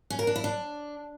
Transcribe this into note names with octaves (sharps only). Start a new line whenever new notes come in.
C#4
A#4
D4
E4
D4